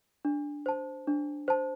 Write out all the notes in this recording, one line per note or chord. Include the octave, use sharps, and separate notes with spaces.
D4
C5 A5
D4
C5 A5